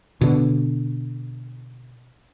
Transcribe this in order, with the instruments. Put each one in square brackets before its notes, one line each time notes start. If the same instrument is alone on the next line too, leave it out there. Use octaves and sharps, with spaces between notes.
[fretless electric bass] B2 D3